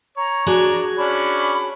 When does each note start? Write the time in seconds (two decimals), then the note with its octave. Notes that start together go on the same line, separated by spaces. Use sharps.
0.17 C#5 A#5
0.47 D4 F#4 G#4 G#5
0.97 C#4 D4 B5